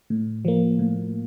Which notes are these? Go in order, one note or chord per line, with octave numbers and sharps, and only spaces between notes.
A2
F3 A#3
A2